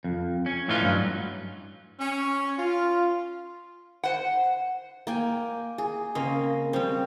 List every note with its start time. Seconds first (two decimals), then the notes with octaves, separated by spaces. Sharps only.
0.04 F2
0.46 C#4
0.68 A2 E3 C#4 D#4 F4
0.81 G2 F#3
2.00 C#4
2.58 F4
4.04 C5 F#5
5.07 A#3 G5 G#5
5.78 G#4
6.15 C#3 A#3 C4 D#5
6.73 C#3 G3 C4